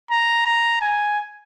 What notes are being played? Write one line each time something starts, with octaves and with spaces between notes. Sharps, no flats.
A#5
A#5
G#5